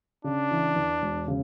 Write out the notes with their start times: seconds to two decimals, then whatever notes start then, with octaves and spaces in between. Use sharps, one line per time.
0.24 C#3 D4
0.51 E3
0.76 E2
1.02 E1
1.28 C#3